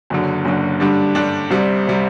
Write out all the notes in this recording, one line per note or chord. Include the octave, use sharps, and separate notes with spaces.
F#1 F#2 D3
F#1 F#2 D3
G2 D3 G3 D4
G2 D3 G3 D4
C2 C3 G3
C3 G3